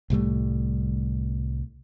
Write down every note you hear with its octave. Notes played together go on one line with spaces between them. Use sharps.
C2 A2 G3 A3